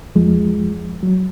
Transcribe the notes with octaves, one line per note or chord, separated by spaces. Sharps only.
F2 F3 G#3
F#3